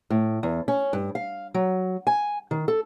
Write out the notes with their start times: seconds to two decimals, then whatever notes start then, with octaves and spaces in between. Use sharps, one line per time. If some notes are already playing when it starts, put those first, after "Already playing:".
0.10 A2
0.43 E2
0.68 C#4
0.93 G2
1.15 F5
1.54 F#3
2.07 G#5
2.51 D#3
2.68 A4